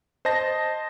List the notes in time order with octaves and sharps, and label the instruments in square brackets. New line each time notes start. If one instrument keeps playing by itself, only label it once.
[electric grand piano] C5 D#5 A5 A#6